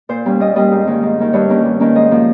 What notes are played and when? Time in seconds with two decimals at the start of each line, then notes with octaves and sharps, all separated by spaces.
0.09 A#2 C5
0.25 G3 A#3 C#4
0.40 A#2 D#5
0.56 G3 A#3 C#4 D#5
0.72 G#2
0.87 D#3 A#3 C#4
1.03 G#2
1.18 D#3 A#3 C#4
1.33 G2 C#5
1.49 D#3 A#3 C#4
1.65 G2
1.80 D#3 A#3 C#4
1.95 G#2 D#5
2.11 F3 A#3